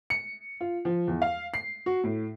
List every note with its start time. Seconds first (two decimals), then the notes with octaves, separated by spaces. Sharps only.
0.10 C#7
0.61 F4
0.85 F3
1.07 E2
1.22 F5
1.54 C7
1.86 F#4
2.04 A2